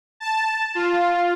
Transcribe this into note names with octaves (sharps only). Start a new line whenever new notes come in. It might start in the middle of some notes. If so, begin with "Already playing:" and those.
A5
F4